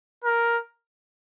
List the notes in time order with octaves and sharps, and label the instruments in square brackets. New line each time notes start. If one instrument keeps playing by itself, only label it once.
[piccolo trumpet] A#4